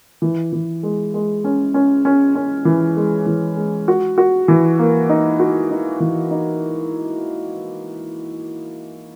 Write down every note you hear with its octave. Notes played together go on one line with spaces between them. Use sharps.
E3
E3
G#3
G#3
C#4
C#4
C#4
C#4
E3
G#3
E3
G#3
F#4
F#4
E3
A#3
D#4
F#4
D#4
E3
D#4